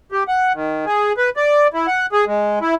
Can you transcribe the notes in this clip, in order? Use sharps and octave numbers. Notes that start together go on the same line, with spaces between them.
G4
F#5
D#3
G#4
B4
D5
E4
F#5
G#4
G#3
E4